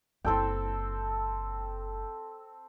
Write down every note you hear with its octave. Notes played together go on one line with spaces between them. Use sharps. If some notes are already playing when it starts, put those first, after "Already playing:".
F#1 C4 E4 A4 G5